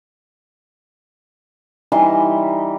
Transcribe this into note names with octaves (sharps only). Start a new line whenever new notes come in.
E3 G3 D#4 C6